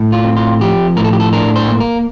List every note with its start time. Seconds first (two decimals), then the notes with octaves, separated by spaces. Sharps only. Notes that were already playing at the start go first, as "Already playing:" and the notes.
Already playing: A2
0.12 F4
0.24 C4
0.37 F4
0.61 F3 G4
0.96 A2 A#4
1.04 A4
1.13 G4
1.20 A4
1.33 D4 A#4
1.56 C5
1.68 A#3
1.80 A#4